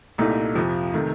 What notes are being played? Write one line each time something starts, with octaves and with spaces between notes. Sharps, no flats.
C2 A#2 A3 D#4
F2 C3 F3
C3 D#3 A3